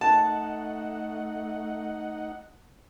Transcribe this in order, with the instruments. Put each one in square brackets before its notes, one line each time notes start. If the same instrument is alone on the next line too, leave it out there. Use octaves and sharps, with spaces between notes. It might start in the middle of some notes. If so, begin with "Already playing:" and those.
[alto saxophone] A3 [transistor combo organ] D#4 F#5 [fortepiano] A5